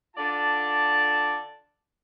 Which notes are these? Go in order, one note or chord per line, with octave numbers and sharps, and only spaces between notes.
D3 F4 D5 A5